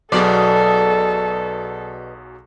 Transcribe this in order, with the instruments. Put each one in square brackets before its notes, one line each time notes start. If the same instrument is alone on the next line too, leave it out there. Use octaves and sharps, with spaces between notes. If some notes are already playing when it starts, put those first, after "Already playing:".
[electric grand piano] B1 F#3 G#4 [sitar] B2 D5 [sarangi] A4